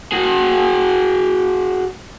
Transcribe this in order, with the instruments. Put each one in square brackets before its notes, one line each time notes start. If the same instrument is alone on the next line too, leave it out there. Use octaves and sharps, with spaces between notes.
[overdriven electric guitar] F#4 G#4